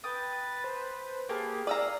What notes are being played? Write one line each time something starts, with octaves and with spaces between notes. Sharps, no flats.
B4 G5 D#6 A6
C5 A5
A#3 G4 G#4 A5
D5 D#5 F5 A#5 E6